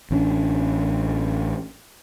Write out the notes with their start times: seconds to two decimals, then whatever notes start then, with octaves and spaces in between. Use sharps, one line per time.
0.11 A1 C#4 D4